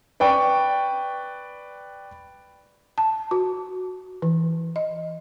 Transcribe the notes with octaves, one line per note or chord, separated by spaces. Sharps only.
B4 D5 G5 C#6
A5
F#4
E3
D#5